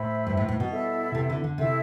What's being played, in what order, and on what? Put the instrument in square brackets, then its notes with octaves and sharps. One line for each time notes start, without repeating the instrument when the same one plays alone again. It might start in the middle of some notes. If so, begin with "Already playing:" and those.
Already playing: [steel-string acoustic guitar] A2 [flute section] C5 E5 B5
[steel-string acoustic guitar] G2
A2
A2
B2
[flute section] E4 A4 E5
[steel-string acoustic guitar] C3
D3
D3
[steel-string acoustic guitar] C3 [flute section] E4 A4 E5